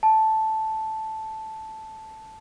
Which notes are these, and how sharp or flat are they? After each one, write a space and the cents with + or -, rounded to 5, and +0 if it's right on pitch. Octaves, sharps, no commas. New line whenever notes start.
A5 -5